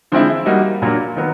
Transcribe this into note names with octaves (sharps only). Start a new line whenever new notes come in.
D3 F3 G#3 C4 E4
G3 A#3 D#4 F#4
A#2 F#3 A#3 D4
D#3 F#3 B3